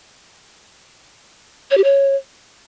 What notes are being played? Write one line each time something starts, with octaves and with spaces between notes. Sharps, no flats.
C#5
G4
C#5